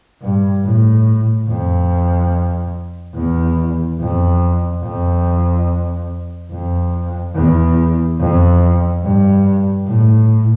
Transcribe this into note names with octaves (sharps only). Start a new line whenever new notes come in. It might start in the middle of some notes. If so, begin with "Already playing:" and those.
G2
A2
F2
E2
F2
F2
F2
E2
F2
G2
A2